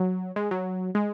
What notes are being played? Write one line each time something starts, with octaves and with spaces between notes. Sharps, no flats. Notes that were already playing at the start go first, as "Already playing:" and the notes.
Already playing: F#3
G#3
F#3
G#3